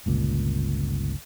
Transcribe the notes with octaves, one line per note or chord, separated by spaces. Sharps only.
G1 C#2 A#2